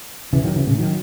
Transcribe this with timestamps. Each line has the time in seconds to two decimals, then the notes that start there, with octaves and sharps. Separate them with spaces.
0.33 C#3 E3
0.44 D#3 F#3
0.56 C#3 E3
0.67 A2 C#3
0.78 D#3 F#3